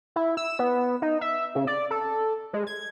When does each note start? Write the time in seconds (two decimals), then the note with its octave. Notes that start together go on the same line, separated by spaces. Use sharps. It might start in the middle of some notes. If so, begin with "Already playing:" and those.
0.16 E4
0.37 E6
0.59 B3
1.02 D#4
1.21 E5
1.55 C#3
1.67 D5
1.91 A4
2.53 G#3
2.67 G#6